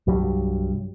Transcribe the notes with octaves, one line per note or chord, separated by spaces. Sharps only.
C2 G2 F#3 G3